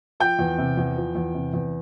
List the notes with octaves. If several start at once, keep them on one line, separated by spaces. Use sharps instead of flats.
F3 G5 G6
E2
C3
E2
F3
E2
C3
E2